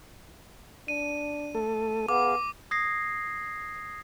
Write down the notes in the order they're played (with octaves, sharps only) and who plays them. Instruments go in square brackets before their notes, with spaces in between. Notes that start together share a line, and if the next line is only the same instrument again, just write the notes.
[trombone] D4 [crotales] D#7
[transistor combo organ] A3 A4
[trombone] B3 [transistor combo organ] G#4 F5 [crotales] D6
[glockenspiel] D#6 G#6 A#6 C7